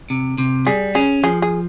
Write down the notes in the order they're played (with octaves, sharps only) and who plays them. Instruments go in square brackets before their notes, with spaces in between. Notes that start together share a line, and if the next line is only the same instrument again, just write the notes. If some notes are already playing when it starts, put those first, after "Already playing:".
[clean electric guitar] C3
C3
[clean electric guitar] G3 [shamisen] G#4
[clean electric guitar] C#4 [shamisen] G#4
[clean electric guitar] F3 [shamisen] G#4
[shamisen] G#4